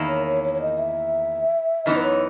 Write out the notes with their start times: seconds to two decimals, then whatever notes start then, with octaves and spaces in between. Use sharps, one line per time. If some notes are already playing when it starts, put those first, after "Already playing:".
Already playing: E2 D#3 A#3 E4
0.08 C#5
0.27 C#5
0.44 C#5
0.54 C#5
0.62 D#5
0.79 E5
1.85 F#2 E3 B3 D#4 D#5
1.96 B4
2.03 C#5